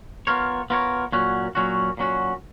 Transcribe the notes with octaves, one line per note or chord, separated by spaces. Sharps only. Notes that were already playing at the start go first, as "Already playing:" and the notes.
B3 F4 A#4 C#5
B3 F4 A#4 C#5
A#2 F#3 C#4 F#4
A#2 F#3 C#4 F#4
A#2 F#3 C#4 F#4